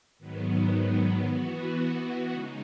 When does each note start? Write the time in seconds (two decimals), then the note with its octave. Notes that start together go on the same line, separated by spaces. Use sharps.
0.19 G#2 D#3 F#3 B3
1.25 E3 B3 F#4
2.31 C#3 G#3 D#4